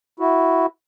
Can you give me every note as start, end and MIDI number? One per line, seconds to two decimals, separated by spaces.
0.20 0.66 64
0.20 0.66 66